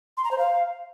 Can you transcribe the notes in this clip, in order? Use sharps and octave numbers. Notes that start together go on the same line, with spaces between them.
C6
A#5
C5
F5